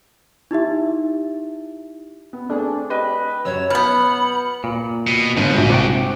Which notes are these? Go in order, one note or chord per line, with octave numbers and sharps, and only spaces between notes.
D#4 E4 G4 E5
B3
A3 C4 D4 G#4
G4 B4 D#5 G5
F#2 C#5 E6
B2 B3 B5 F6 G6 C#7
A#2
B2
G1 G#2
A#1 F#4
C3 F#4 G5 D6